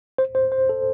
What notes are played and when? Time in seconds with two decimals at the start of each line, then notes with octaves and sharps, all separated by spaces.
0.18 C5
0.35 C5
0.52 C5
0.69 A4